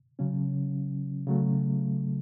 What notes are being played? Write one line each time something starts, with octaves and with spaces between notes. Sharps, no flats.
C#3 F#3 C#4
C#3 F#3 A3